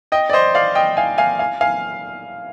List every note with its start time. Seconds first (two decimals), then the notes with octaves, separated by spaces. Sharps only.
0.12 D#5 G5
0.30 D5
0.33 C5 D#5
0.55 D5 F5
0.75 D#5 G5
0.97 F5 G#5
1.18 F5 G#5
1.39 F5 G#5
1.61 F5 G#5